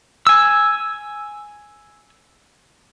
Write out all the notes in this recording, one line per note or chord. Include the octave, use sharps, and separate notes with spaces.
G#5 E6